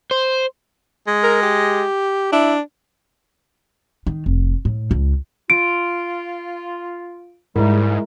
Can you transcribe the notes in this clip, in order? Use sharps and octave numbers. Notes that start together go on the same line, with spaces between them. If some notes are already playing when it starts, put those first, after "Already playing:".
C5
G#3
A#4
G4
D4 E4
D#3
F1
A2
C#2
F4 D7
G#2 G3 G#3 E4 A#4